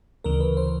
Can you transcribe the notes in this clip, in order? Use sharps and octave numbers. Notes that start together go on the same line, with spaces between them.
D2 C#3 E3 A#4
B4
C5